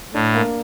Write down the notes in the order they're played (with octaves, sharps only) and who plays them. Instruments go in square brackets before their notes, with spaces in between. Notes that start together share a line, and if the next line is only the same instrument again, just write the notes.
[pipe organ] A2 [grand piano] D4
[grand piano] A#3